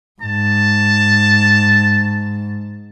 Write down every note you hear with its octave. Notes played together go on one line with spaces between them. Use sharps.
G#2 A5